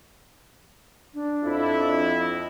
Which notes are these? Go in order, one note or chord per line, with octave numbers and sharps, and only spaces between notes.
D4
F2 E4
D4
D#5